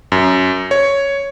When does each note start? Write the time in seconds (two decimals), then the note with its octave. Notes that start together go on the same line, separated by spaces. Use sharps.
0.12 F#2
0.71 C#5